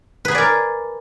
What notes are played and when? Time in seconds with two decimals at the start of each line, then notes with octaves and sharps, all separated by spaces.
0.25 B4
0.28 G#4
0.31 G#5
0.35 D5
0.38 A#4